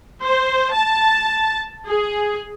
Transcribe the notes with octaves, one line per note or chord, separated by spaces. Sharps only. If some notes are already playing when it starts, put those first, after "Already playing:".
C5
A5
G#4